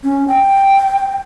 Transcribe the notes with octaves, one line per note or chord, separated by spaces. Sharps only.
C#4
G5